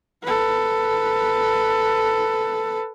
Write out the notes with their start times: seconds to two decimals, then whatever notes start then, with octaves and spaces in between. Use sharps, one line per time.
0.24 A4 B4